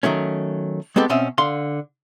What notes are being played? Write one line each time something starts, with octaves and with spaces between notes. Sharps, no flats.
D#3 F#3 A3 C#4
G#3 B3 C4 G4 A4
B2 C4 C#4 E5
D3 F5 C6